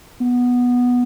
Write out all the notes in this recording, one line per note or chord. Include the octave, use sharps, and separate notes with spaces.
B3